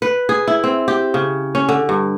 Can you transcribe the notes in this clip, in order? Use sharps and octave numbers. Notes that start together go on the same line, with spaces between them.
B4
G#4
E4
C4
G4
C#3
C#4
D3
G2